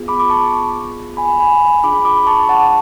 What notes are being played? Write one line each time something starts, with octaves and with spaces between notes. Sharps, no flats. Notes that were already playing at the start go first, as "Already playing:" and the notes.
Already playing: B3 F4 G#4
B5 D6
D6
A5 C#6
G#5 B5
G#5 B5
D4 F4 G#4 B5 D6
B5 D6
A5 C#6
F#5 A5